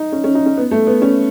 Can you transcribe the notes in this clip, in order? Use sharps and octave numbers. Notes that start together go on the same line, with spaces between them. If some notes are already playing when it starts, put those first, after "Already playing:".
Already playing: D#4
C#4
C#4
D#4
C#4
B3
A3
B3
C#4